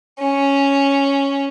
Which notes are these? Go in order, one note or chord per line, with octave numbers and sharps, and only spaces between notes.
C#4